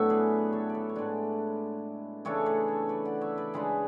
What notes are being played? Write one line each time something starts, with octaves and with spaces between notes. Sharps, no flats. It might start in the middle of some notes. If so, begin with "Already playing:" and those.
Already playing: A2 F#3 B3 D4 C#5 E5
G#4 B4
A4 C#5
D5
A4 C#5
C#5
A2 G#3 D4 B4 D5
C#3 E3 A3 D4 A4 C#5
G#4 B4
A4 C#5
B4 D5
D5 F#5
C#5 E5
B4 D5
C#3 G#3 D4 G#4 B4